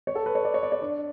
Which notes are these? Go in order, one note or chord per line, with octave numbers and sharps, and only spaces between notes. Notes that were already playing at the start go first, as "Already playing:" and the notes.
C#5
A4
B4
C#5
D5
C#5
D5
C#5
D4